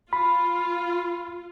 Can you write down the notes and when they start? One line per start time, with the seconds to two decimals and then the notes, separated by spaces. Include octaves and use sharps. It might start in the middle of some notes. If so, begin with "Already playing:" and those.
0.13 F4 B5